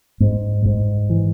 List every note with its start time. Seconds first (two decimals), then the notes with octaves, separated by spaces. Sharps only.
0.20 G#2
0.66 G#2
1.10 E3